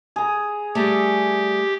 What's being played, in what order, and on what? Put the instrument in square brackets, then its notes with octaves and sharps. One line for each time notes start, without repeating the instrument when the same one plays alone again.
[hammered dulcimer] G#4 A#5
[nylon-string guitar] G3 A3 [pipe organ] G4